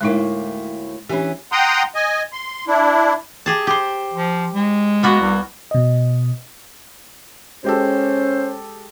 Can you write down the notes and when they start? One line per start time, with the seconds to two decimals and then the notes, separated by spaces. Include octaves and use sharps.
0.01 D2 A2 G#3 A#3 D#4 E4
1.09 E3 C#4 D4 G4
1.52 F#5 G5 A#5 C6 D#6
1.95 D#5 G#5
2.33 C6
2.67 D4 E4
3.46 G4 G#4 A5
3.67 G4 C5
4.13 F3
4.54 G#3
5.03 A#3 B3 F#4
5.20 C2
5.71 B2 D#5
7.64 G#3 C#4 G4 A4 C5